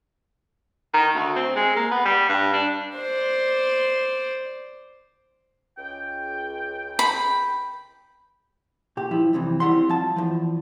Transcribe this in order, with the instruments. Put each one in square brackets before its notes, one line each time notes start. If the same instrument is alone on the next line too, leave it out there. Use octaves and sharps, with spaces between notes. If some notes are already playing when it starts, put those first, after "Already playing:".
[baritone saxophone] D#3
D2
C4
G#3
A#3
B3
G3
G2
D4
[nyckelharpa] C5 D5
[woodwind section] C#2 G5
[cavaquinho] B5
[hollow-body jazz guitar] A#2 G4
G2 F3 E4
C2 F2 C3 E3
D#2 G3 C4 E4 F#5 C6
F3 A5
E2 F3